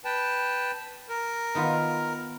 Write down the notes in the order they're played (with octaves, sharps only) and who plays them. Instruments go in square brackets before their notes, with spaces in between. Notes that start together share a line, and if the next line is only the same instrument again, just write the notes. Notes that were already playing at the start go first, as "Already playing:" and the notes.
[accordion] B4 G5 A5
A#4
[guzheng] D#3 B3 F4